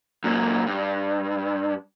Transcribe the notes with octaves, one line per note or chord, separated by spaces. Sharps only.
F#2 A#2
G2